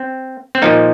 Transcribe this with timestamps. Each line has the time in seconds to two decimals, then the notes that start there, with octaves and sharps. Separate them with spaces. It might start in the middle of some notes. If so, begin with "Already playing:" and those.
Already playing: C4
0.55 C4
0.62 A#2 F3 A#3 D#4